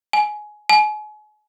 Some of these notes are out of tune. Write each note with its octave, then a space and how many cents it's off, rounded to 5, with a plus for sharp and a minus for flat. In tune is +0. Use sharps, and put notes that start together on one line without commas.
G#5 +15
G#5 +35